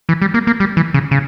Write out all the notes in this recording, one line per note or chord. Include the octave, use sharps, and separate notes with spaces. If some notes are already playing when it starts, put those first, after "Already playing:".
E3
G3
A#3
A#3
G3
E3
C#3
C#3